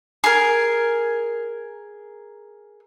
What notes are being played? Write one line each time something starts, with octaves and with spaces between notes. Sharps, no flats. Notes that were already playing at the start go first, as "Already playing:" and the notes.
G#4 A#4